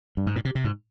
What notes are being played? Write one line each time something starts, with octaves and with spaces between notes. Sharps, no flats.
G2
G#2
A#2
C3
C3
G#2